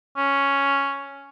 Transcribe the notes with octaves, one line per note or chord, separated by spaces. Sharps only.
C#4